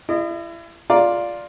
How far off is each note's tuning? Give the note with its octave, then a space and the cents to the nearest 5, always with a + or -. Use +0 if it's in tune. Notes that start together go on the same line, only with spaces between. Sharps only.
E4 +35 D#5 -35
F4 +5 D5 +0 A#5 +0